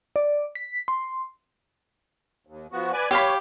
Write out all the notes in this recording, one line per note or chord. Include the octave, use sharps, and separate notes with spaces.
D5
B6
C6
D#2
F3 B3 F#4
B4 D5 G#5
G4 C#5 F5 B5